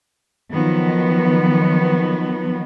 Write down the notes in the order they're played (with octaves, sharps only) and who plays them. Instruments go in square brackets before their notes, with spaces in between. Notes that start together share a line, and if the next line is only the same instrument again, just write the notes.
[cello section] D#3 F3 F#3 B3